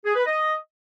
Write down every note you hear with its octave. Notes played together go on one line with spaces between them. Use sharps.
G#4
B4
D#5